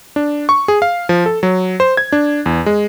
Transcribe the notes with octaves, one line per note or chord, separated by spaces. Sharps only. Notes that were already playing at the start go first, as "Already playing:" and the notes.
D4
C#6
G#4
F5
F3
A4
F#3
C5
G#6
D4
E2
G#3